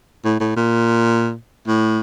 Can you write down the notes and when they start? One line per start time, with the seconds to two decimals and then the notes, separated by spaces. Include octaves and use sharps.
0.25 A2
0.40 A2
0.56 A#2
1.68 A2